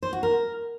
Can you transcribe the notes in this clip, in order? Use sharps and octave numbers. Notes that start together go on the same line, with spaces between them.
C5
F#4
A#4